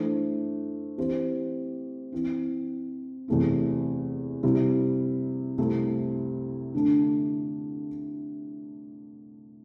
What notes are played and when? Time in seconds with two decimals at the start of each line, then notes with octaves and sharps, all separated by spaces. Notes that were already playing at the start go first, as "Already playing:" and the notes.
Already playing: E3 A3 D4 A4 C5
0.98 E3 C4 G4 C5
2.12 E3 C4 E4
3.28 E2 C3 A3 E4
4.43 C3 G3 E4
5.58 C2 C3 A3 E4
6.74 D3 A3 D4